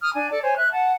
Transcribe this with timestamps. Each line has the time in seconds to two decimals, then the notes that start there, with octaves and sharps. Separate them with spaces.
0.01 D#6 F6
0.14 D4 G#5
0.31 A4 D5
0.43 C5 C#5 G#5
0.57 E5 F#6
0.72 F#5 A5